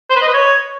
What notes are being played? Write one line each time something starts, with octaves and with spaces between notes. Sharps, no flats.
C5
B4
D#5
B4
C#5